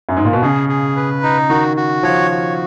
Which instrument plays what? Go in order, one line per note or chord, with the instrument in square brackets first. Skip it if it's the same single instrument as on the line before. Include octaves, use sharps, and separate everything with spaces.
[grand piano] F#2
G#2
A#2
B2
[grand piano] C#3 [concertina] G#4
[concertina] G#4
B4
D#4
[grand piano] D#3 [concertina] F#4
[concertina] F#4
[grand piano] F3 [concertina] C#5
[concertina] F#4